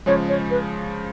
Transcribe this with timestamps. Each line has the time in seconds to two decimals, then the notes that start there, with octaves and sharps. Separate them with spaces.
0.06 C#3 F3 G#3 C#5
0.28 C#5
0.50 B4